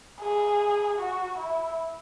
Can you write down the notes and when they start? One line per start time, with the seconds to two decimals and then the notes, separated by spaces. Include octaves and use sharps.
0.20 G#4
0.98 F#4
1.37 E4